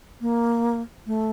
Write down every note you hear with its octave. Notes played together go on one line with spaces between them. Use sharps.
A#3
A3